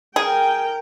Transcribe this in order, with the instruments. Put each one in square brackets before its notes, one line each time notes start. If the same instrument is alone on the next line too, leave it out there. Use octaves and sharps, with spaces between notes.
[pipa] G#4 [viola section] A#4 G5